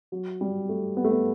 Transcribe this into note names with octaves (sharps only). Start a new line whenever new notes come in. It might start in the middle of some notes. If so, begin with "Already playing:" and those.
F#3
G3
A3
B3
A3
B3